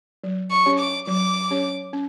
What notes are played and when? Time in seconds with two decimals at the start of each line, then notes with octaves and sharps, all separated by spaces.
0.24 F#3
0.51 C#6
0.66 C#4 G4 C#5
0.79 D6
1.07 F#3 D6
1.51 C#4 G4 C#5
1.93 C#4